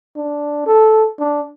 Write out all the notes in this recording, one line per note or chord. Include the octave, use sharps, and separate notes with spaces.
D4
A4
D4